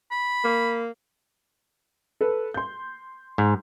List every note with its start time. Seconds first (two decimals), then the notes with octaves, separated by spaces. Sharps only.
0.12 B5
0.44 A#3
2.21 A4 B4
2.54 C6 G6
3.38 G#2